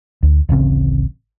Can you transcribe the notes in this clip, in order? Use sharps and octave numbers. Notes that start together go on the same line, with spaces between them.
D2
D1 A1 C#3 C4